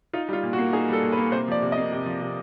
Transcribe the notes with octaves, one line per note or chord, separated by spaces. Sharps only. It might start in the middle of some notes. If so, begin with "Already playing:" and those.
D#4 F4
G3 F4
A#2
F#4
A#3
D#4 G#4
G3 A4
A#2
B4
A#3
C3 C5
F3 D5
C3
D#5
A#3
C3
F3
C3